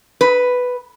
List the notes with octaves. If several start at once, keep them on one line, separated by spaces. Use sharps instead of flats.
B4